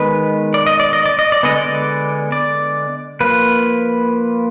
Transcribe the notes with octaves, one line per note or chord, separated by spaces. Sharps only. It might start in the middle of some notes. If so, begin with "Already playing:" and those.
Already playing: D#3 G#3 B3 B4
D5
D#5
D5
D#5
D5
D#5
D5
D3 G#3 B3 D#5
D5
D5
F3 A#3 B4